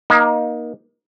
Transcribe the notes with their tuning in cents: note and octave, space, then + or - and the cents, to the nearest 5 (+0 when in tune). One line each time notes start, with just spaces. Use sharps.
A#3 +30 D#4 +0